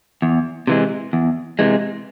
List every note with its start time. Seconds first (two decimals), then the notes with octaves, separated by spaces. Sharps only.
0.22 E2
0.67 C3 E3 G#3
1.13 E2
1.59 C3 E3 G#3